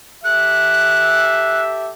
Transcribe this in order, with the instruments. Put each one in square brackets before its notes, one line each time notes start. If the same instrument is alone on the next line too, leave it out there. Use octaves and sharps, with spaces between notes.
[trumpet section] G4 A4 E5 [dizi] F#6